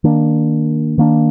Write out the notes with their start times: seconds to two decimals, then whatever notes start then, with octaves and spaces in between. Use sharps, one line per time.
0.04 D#3 A#3 D4
0.98 D#3 A#3 D4